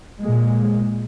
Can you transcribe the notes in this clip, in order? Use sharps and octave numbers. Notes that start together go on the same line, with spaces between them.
A#2 G#3